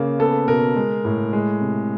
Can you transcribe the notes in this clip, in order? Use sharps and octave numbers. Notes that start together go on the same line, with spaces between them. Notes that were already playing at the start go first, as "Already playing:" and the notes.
Already playing: C#3 A#3
B3 A4
B2 A#4
G#3
A2
G#3
C3